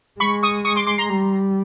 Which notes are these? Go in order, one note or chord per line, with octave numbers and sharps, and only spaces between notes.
G#3 B5 C#6
C#6 D#6
C#6 D#6
C6 D6
C6 D6
A#5 C6
G3